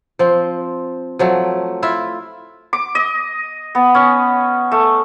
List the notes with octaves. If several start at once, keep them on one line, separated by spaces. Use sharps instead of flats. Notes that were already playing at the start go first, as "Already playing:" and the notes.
F3 C4
F3 F#3 A3
E4 F4 E5
D6
D#5
B3
C#4
A3